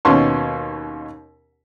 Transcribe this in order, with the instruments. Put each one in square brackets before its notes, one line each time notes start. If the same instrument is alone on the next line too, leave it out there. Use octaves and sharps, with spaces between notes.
[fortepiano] D#2 B2 C#4 C6 C#6